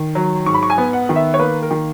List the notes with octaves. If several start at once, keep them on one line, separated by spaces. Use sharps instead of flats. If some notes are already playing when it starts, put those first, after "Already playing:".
Already playing: D#3
F#3
G#2 C#6
B5
C#6
G#5
B3
F#5
D#3
E5
C#5
A#3 B4
A#4
D#3